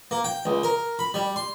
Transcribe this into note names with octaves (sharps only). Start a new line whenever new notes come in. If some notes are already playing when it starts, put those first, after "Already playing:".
A#3
G5
C#2
A#4
B5
G3
C6